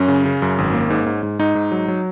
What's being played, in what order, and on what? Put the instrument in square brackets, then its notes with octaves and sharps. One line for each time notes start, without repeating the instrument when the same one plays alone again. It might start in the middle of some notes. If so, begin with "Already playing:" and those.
Already playing: [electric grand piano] F#2 C#4
C#3
C#3
F#2
G#1
A#3
G#2
G#2
G#2
G#2 D#4
G#2
F#3
F#3